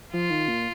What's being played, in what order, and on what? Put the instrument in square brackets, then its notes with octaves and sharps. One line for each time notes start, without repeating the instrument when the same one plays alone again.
[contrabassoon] F3 [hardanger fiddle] F4
[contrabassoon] D#3
A#2